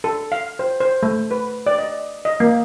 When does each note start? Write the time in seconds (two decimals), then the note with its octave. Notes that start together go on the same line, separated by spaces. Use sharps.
0.04 A4
0.32 F5
0.59 C5
0.80 C5
1.03 A3
1.31 B4
1.67 D5
1.79 D#5
2.25 D#5
2.40 A#3